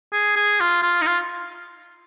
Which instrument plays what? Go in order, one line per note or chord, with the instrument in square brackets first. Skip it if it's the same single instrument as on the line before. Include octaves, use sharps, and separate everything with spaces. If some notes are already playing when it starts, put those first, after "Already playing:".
[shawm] G#4
G#4
F4
F4
D#4
F4